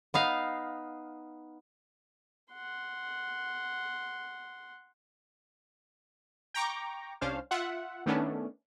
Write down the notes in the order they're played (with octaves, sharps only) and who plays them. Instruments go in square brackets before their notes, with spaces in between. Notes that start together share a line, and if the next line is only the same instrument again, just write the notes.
[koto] B3 D#4 F5
[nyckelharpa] F#5 C6
[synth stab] G5 A#5 C#6 D6
C2 C#4 D4 C5 F5
F4 E5 F#5
D#3 A3 B3 C#4 D4